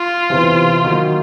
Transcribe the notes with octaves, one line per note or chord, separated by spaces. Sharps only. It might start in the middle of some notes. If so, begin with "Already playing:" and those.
Already playing: F4
E2 C3 E3
D#3 F#3 A#3 D#4 F#4